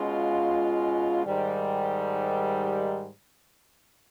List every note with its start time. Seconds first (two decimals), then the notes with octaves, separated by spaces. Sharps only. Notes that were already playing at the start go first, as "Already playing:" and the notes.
Already playing: B2 G#3 C#4 F4
1.25 G#2 D#3 G3